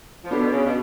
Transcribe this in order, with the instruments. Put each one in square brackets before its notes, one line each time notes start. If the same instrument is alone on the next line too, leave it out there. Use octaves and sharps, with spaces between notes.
[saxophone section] F3
[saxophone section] B2 D3 [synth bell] B3 D4 F#4 B4
[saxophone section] B2
C#3
B2